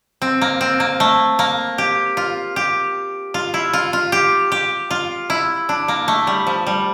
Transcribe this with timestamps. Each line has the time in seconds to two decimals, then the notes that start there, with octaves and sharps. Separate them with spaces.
0.22 C4
0.42 A#3
0.61 C4
0.80 A#3
1.00 A3
1.39 A#3
1.78 G4
2.17 F4
2.56 G4
3.34 F4
3.54 E4
3.73 F4
3.93 F4
4.12 G4
4.52 G4
4.91 F4
5.30 E4
5.69 D4
5.88 A#3
6.08 A3
6.27 G3
6.47 F3
6.67 G3